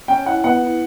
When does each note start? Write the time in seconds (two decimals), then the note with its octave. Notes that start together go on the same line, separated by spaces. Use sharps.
0.08 C#4 G5
0.26 E4 F#5
0.44 B3 F#5
0.62 E4